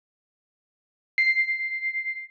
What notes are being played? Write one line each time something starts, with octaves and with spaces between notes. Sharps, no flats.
C7